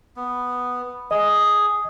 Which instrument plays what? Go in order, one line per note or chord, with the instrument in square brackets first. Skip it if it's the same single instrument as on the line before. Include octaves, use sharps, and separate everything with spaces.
[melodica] B3
[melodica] G#4 [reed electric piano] D#5